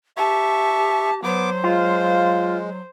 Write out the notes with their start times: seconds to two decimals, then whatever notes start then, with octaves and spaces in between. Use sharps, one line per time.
0.17 G4 E5 A5 C#6
1.24 F#3 B3 C5 D6
1.64 G#3 F4